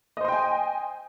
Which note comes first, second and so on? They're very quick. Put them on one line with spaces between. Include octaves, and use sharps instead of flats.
D#5 C5 C6 G5 G#5